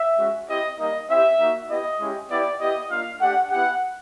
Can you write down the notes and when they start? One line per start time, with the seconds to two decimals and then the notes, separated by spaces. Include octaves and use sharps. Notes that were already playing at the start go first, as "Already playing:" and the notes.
Already playing: E5
0.18 G#3 C#4 F#4
0.48 C4 E4 G4 D#5
0.78 G3 A#3 D#4 D#5
1.09 C4 E4 G4 E5
1.38 A#3 D#4 F#4
1.68 B3 E4 G4 D#5
1.99 G#3 C#4 E4 G4
2.29 B3 E4 G4 D5
2.59 B3 E4 G4 D#5
2.89 A#3 D4 F4 F5
3.20 A3 D4 G4 F#5
3.50 B3 E4 G4 F#5